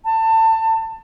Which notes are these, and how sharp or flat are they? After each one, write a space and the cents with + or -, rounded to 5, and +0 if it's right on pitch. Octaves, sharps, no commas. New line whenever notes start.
A5 +25